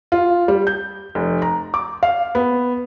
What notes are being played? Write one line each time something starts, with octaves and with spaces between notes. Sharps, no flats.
F4
G3
G6
F1
A#5
D6
F5
B3